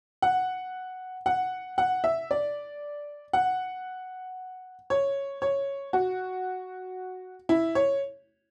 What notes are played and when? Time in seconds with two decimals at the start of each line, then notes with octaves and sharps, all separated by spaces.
0.22 F#5
1.26 F#5
1.78 F#5
2.04 E5
2.31 D5
3.33 F#5
4.90 C#5
5.42 C#5
5.93 F#4
7.49 E4
7.75 C#5